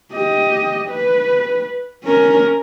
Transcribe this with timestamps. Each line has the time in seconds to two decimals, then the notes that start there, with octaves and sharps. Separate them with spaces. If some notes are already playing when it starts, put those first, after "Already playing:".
0.13 G4 D#5
0.90 B4
2.04 C#4 A#4